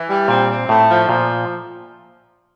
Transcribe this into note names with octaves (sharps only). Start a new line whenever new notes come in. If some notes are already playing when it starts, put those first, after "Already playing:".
Already playing: E3
G3
A#2 C4
C4
A2 A3
F3
A#2 F3